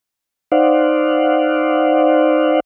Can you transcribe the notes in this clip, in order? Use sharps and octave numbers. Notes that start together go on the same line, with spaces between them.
D#4 C5 D5 F5 F#5